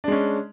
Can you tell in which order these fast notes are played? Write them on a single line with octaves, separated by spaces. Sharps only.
D4 G#3 C#4